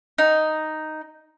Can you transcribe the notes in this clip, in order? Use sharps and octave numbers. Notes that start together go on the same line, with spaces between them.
D#4